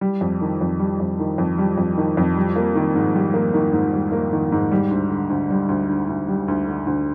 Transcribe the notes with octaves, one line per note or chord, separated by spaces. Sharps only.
G3
F2
D#3
F2
G3
F2
D#3
F2
G3
F2
D#3
F2
G3
A#3
D#3
G#2
G3
A#3
D#3
G#2
G3
A#3
D#3
G#2
G3
D2
D3
D2
G3
D2
D3
D2
G3
D2
D3
D2